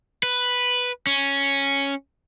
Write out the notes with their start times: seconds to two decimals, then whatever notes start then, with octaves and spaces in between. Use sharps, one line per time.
0.23 B4
1.07 C#4